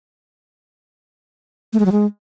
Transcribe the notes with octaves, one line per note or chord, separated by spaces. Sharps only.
A3
G#3
F#3
G#3